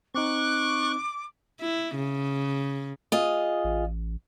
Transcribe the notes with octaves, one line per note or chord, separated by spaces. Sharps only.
C4 D#4 C#6 D6 F#6
E4
C#3
F4 G#4 D#5
A1